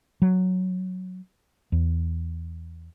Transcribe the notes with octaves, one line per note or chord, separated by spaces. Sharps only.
F#3
E2